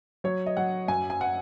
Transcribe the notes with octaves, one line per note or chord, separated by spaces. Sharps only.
F#3 C#5
D#5
F#3 F#5
F#2 G#5
G#5
F#5